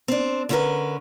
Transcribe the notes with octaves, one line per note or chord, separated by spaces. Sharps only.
C4 D4
D3 C#4 E4 F#4 A#4 B4